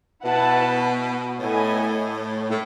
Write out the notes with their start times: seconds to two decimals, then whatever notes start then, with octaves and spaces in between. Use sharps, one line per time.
0.25 B2 E4 B4 F#5 A5
1.40 A2 B3 E4 A4 D#5 G#5
2.50 A2